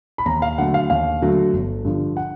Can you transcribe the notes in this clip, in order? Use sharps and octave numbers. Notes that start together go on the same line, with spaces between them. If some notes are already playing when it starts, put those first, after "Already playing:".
B5
D#2 A#5
F5
D3 F#3 A3 F#5
F5
D#2 F5
D3 F#3 A3
G1
G2 D3 F3
F#5